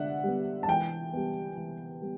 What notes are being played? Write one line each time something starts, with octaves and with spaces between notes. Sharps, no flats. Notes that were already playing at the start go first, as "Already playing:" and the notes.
Already playing: D3 D5 E5 F#5
G3 B3
A5
E3 G5
G3 B3
E3
G3 B3